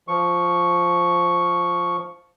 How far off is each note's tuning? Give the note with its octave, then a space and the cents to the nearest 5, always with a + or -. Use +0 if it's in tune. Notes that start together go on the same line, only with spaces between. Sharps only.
F3 +0 C#6 +0